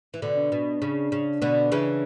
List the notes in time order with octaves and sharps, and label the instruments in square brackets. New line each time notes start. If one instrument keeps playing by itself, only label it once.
[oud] E3
B2 D3
[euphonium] D4
[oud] B2
C#3
C#3
B2 D3
C#3 E3